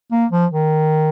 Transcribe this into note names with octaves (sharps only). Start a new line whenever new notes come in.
A#3
F3
D#3